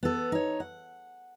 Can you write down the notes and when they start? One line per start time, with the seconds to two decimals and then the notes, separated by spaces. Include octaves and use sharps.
0.03 B3 A4
0.32 D#4 C#5
0.60 F#5